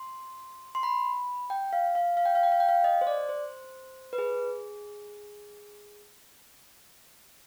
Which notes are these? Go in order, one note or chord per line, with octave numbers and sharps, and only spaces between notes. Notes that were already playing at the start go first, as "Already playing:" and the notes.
Already playing: C6
C6
B5
G5
F5
F5
F5
G5
F5
G5
F5
G5
F5
D#5
C5
D5
C5
B4
G#4